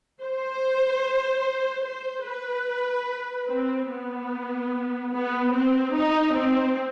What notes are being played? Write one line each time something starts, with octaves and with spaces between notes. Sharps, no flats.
C5
C5
B4
C4
B3
B3
C4
D#4
C4